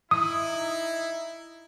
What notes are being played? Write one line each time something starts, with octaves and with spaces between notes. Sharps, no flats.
D#4 E4 D#6